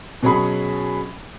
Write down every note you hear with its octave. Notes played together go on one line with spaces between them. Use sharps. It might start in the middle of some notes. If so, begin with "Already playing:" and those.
B2 F#3 C#4 G#4 B5